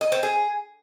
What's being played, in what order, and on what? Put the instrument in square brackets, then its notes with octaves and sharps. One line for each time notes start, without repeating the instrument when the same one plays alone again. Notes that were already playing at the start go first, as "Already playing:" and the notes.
[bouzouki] D#5
C4
G#4